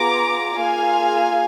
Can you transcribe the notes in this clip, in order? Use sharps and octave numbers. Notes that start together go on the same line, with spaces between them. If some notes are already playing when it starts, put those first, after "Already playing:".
Already playing: B3 F4 G#4 A#5 D6
A#3 F4 G#4 F5 G#5